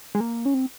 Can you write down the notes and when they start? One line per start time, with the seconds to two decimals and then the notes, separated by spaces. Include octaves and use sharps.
0.15 G#3
0.20 A#3
0.45 C#4
0.54 C4